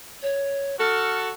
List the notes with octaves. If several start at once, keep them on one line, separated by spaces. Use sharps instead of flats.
C#5
F#4 A4 F6